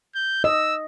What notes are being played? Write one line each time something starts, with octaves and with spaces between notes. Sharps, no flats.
G6
D#5 E6